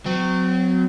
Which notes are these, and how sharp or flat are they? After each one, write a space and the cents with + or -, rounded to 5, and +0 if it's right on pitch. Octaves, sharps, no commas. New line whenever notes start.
F#3 -10 C4 -35